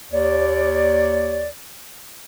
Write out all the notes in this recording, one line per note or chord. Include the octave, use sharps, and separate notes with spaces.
D#2 C#5 D5